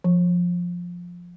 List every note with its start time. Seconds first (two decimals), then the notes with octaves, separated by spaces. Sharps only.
0.04 F3